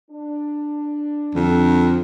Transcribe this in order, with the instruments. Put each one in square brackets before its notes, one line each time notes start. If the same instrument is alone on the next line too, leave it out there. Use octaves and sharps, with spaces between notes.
[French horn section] D4
[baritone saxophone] F2 [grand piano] D3